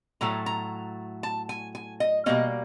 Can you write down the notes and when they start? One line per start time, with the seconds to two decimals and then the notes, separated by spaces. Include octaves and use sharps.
0.21 A2 F#3 A3 A#5
0.46 A#5
1.23 A5
1.49 G#5
1.75 G#5
2.00 D#5
2.26 B2 G3 A#3 C#4 D#5